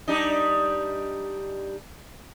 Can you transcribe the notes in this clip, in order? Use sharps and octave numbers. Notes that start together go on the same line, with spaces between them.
G3 D4 D#4